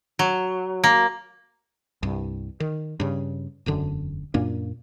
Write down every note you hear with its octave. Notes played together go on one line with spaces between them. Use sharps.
F#3
A#3
C2 G2
D#3
G2 C#3
E1 F#2 D3
F#2 A#2 A#3 D4